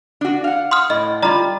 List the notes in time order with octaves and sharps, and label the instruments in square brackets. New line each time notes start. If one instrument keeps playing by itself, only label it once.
[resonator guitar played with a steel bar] D4 F#4
F5 F#5
[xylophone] C6 D#6 F6
[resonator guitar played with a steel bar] A2 [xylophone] D#5
[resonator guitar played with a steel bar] G3 F4 [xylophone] D5 A#5